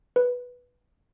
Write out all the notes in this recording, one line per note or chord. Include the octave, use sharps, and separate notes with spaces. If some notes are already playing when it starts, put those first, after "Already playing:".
B4